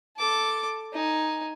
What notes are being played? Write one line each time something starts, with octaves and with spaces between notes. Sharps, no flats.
A4 D6
D#4 G#5